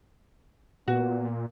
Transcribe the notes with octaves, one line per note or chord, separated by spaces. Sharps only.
A#2 B3 F#4